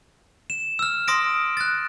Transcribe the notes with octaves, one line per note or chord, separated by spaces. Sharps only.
E7
E6 F6
C6 D#6 A#6 D7
F#6 A6